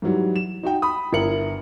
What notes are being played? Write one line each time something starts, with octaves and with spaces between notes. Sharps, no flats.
G#2 E3 F#3 G3
E7
D#4 F#4 G5
B5 D#6
G1 E4 A#4 C#7 F#7